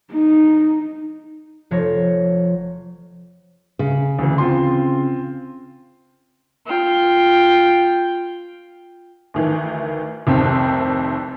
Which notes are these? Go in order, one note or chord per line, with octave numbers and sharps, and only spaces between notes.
D#4
F1 F3 C#5 A#6
C#3
D2 E3
C4 F4 C6
F4 G5
D2 D#3 E3
F1 C2 C3 D#3 C4